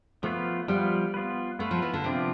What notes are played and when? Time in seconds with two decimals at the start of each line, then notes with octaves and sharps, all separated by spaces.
0.23 F3 A3 B3 F4 B4
0.68 F3 G3 B3 F4 B4
1.14 B3 F4 B4
1.59 A3 B3 F4 B4
1.71 F3
1.82 E3
1.94 D3
2.04 C3 F3 B3 D4 F4